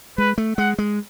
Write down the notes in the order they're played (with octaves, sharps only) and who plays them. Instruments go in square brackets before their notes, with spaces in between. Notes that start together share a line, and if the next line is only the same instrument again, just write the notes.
[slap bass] G#3 [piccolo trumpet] B4
[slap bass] A3
[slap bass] G#3 [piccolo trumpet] F#5
[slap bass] G#3